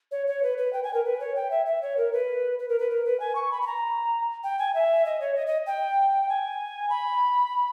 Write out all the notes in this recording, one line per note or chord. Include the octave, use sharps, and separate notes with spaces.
C#5
C#5
B4
B4
G5
G#5
A#4
B4
C#5
G5
E5
E5
C#5
A#4
B4
B4
A#4
B4
A#4
B4
G#5
C#6
B5
B5
A#5
G5
G#5
E5
D#5
C#5
D#5
D#5
G5
G#5
B5